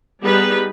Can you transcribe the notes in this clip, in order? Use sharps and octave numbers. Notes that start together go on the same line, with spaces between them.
G3 B3 D#4 G#4 B4